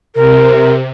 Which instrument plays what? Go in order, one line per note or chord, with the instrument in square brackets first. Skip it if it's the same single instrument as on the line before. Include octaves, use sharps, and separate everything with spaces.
[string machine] C3 [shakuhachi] A#4